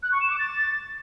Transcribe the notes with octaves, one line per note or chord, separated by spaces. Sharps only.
F#6
C#6
E7
D6
A6